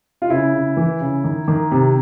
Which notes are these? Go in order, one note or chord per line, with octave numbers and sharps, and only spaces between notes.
F4
C#3 E4
C#3
E3
C#3
D#3
D#3
C3